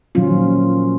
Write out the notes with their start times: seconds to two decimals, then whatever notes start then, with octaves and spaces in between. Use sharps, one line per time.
0.15 A#2 D#3 F3 F#3 C#4 F4